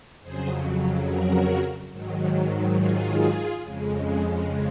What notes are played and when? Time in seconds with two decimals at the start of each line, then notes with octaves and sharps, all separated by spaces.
0.22 F2 C#3 F#3 G#4 C5
1.07 F#4 A#4
1.92 G#2 D#3 F#3
2.76 F4 G#4
3.61 F2 C#3 G#3